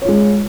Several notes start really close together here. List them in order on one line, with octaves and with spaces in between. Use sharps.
C#5 F4 G#3